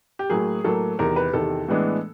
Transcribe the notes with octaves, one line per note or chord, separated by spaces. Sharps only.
G4
A2 F#3 A#3 G#4
A2 F#3 A#3 A4
E2 C3 D#3 A#4
B4
E2 C3 D#3 A4
A2 E3 G#3 B3 D4